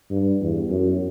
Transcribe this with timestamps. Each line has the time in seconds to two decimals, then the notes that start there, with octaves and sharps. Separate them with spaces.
0.11 G2
0.41 E2
0.70 F#2